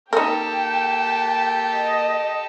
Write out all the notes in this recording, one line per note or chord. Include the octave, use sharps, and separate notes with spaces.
A#3 D#4 G4 A4 A#4 G5
D#5